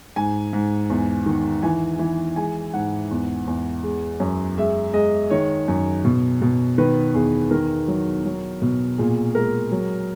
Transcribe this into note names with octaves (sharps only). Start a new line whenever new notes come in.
G#2 G#5
G#2
E2
D#3
E3 G#5
E3
G#3 G#5
G#2 F#5
E2
E2
G#3
F#2
G#3 E5
G#3 D#5
D#3 C#5
F#2
B2
B2
D#3 B4
E2 G#4
D#3 A#4
F#3
F#3
B2
A#2 G#4
G#3 A#4
F#3